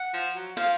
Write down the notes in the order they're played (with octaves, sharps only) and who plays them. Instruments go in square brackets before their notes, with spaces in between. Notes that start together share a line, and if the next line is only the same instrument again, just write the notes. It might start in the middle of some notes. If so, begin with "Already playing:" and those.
Already playing: [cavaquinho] F#5
[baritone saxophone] F3
F#3
[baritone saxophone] F3 [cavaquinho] F5